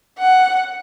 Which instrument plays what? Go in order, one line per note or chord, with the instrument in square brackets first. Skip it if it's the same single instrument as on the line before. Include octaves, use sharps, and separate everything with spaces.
[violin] F#5